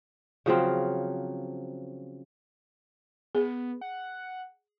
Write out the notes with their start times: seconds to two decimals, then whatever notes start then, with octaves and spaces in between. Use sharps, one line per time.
0.46 C#3 F3 F#3 C4
3.35 B3 G#4
3.81 F#5